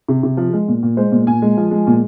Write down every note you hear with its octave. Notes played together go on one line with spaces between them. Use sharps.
C3
C3
F3
G#3
A#2
A#2
G#3 C5
A#2
A#2 G#5
G#3
F3
G#3
A#2